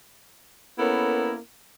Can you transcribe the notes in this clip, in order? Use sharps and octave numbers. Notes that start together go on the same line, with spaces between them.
A#3 B3 C#4 E4 A4 A#4